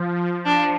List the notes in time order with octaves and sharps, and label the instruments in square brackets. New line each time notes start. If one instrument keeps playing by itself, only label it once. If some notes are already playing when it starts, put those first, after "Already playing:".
Already playing: [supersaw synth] F3
[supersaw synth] F3 [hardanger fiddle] D4